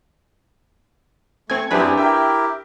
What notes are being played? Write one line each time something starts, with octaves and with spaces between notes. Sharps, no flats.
A3 C4 G#5 C#6 G#6
F#2 C4 D4 E4 G4 G#4 B4 B5
E4 G4 A#4 E5 G5